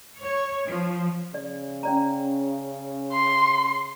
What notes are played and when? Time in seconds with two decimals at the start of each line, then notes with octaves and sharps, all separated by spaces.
0.20 C#5
0.66 F3
1.34 C#3 D5
1.83 C#4 D5 A#5
3.13 C6